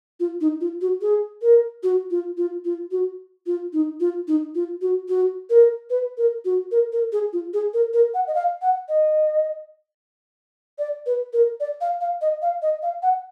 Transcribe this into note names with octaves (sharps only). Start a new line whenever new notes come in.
F4
D#4
F4
F#4
G#4
A#4
F#4
F4
F4
F4
F#4
F4
D#4
F4
D#4
F4
F#4
F#4
A#4
B4
A#4
F#4
A#4
A#4
G#4
F4
G#4
A#4
A#4
F#5
D#5
F5
F#5
D#5
D5
B4
A#4
D5
F5
F5
D#5
F5
D#5
F5
F#5